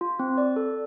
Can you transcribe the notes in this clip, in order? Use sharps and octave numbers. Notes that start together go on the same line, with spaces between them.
F4
C4
D5
A4